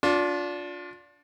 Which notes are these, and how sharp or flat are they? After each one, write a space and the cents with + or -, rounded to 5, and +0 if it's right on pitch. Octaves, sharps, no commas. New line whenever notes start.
D4 -20 F4 +30